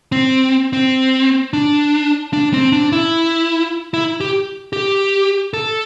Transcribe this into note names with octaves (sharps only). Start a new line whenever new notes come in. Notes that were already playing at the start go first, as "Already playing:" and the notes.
C4
C4
D4
D4
C4
D4
E4
E4
G4
G4
A4